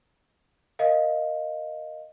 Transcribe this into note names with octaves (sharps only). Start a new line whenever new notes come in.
A#4 D#5 F5